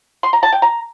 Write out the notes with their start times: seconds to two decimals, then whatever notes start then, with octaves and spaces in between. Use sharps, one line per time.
0.23 C6
0.33 A#5
0.43 A5
0.52 G5
0.62 A#5